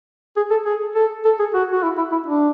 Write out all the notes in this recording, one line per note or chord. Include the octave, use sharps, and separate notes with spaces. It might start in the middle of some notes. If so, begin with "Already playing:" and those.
G#4
A4
G#4
A4
A4
G#4
F#4
F#4
E4
E4
E4
D4